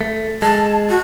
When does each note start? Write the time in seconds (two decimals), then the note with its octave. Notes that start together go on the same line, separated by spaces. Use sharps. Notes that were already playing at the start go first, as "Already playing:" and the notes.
0.01 A3
0.42 G#3 A5
0.90 F#4